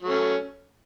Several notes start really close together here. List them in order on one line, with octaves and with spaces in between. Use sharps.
F#3 A3 C#4